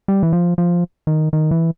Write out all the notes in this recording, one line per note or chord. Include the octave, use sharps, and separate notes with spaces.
G3
E3
F3
F3
D#3
D#3
E3